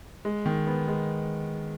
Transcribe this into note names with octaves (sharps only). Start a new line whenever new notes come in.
G#3
D#3
B3
G#3